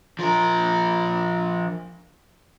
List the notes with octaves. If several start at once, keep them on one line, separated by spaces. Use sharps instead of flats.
F3 A#4